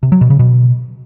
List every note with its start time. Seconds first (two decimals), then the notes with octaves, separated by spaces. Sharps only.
0.03 C3
0.12 F#3
0.21 B2
0.30 C#3
0.39 B2